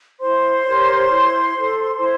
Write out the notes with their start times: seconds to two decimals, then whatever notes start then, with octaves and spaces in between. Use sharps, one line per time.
0.20 E4 C5 C6
0.64 G4 A#4 C#5
1.09 E4
1.54 A4 C5
1.97 E4 C5 C6